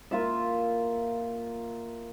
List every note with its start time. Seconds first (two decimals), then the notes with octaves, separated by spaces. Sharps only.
0.11 A#3 F4 E5